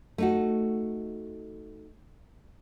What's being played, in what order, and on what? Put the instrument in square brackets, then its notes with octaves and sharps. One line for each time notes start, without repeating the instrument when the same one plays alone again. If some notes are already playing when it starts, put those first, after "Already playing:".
[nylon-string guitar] A3 D#4 F#4